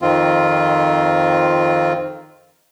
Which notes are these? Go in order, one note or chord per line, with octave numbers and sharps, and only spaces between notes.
F2 D#3 C4 F4